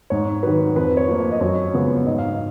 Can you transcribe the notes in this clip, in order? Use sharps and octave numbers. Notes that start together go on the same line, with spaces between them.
G#2 C#5
D#3 F#3 B4
F2 B4
C#5
F3 A#3
C#5
D#5
F#2 C#5
C#3 F3 G#3 B3
G#2 D#5
F5
D#5